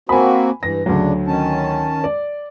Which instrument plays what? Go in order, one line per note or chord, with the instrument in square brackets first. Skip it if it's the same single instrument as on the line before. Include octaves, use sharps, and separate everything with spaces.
[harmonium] A#3 C4 F#4 [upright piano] G#5 B5
[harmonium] G2 E3 [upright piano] A#6
[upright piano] D2 F#3 [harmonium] C#3 D4
[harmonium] D#3 C#4 A5
[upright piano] D5